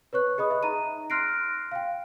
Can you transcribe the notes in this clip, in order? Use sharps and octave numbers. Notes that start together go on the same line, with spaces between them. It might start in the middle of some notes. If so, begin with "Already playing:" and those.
B4 C#5 C#6 F#6
G#4 D#5 B5 D#6
D#5 E5
D#4 A#5 D#7
C6 F6 F#6 A#6 C7 D7
F5 G5